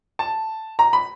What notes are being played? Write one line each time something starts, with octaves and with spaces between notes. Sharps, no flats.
A5
A#5
B5